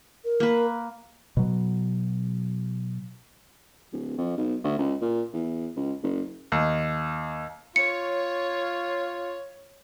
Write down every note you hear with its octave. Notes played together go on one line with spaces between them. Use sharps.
A#4
A#3 B4
B2 F#3
D1
F2
B1
D2
C#2
A#2
E2
C#2
F#1
D#2
F4 C#5 C#7